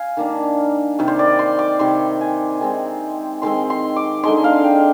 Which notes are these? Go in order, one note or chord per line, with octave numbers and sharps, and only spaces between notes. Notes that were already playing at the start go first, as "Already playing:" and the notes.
Already playing: F5 G#5
D#3 A#3 D4
C3 D#3 G3
C5
D5
C6
D6
C3 D#3 G3 C6
G#5
D#3 G#3 C4
D#3 G#3 C4 C6
C6
D6
D3 G#3 D#4 C6
F5
G5